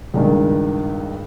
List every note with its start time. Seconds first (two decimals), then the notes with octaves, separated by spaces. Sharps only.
0.14 C#2 G2 D#3